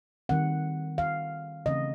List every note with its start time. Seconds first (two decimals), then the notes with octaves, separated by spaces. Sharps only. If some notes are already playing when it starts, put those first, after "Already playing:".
0.29 D#3 G3 C4 F#5
0.98 F5
1.66 C#3 E3 A3 C4 D#5